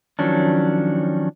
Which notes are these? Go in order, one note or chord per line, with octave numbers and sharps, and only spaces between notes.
D#3 F3 F#3 C#4 D4